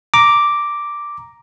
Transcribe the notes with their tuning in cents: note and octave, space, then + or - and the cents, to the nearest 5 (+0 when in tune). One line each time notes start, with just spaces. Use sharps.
A#5 +5 D6 +0